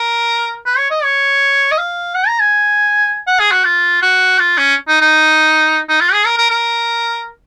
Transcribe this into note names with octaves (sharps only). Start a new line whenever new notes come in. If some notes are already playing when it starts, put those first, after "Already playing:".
Already playing: A#4
B4
C#5
D#5
C#5
D#5
F5
F#5
A#5
G#5
F#5
G#4
F#4
F4
F#4
F4
C#4
D#4
D#4
D#4
F4
G#4
A#4
A#4
A#4